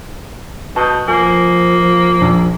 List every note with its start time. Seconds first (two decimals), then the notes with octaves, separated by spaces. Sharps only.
0.76 B2 A5 D#6 G6
1.08 F3 A#3 G#5
2.21 A#1